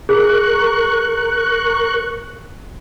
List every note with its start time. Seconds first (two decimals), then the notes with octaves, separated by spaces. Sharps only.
0.09 G#4 A#4 C#6 F#6